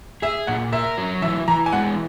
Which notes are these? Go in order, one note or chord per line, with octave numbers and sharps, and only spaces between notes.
G#4 E5
A#2 F#5
A#4 E5
F#3
E3 E5
E3 A#5
G#5
G#3 F#5